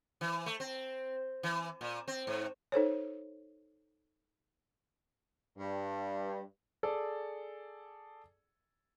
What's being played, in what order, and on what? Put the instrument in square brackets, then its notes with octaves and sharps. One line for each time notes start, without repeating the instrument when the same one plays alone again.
[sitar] E3
A3
C4
E3
A#2
C4
G#2
[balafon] D#4 A4 C5 C#5
[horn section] G2
[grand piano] G#4 A4 D5